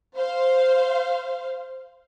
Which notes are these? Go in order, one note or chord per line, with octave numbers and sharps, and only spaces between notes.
C5 F5